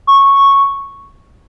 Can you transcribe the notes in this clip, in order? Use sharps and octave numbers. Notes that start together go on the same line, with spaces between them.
C#6